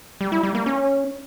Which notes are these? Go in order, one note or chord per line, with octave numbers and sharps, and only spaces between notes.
G3
E4
G3
A#3
C#4